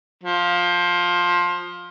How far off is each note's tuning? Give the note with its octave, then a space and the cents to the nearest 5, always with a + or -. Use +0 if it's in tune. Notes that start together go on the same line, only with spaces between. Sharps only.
F3 +15